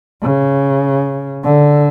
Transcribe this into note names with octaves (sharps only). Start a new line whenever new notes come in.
C#3
D3